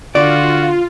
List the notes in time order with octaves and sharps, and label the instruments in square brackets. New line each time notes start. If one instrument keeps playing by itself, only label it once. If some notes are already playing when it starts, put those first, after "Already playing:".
[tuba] D3 [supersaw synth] F4 [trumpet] F#4 [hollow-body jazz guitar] D5